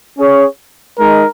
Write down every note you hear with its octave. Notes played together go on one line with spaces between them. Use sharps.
C#4 G#4 C#5
G#3 D#4 A#4